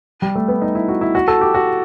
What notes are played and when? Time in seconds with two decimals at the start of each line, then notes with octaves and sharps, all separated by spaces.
0.22 G3
0.35 A3
0.48 B3
0.62 D#4
0.75 E4
0.88 F#4
1.01 E4
1.15 F#4
1.28 A4
1.41 G4
1.54 F#4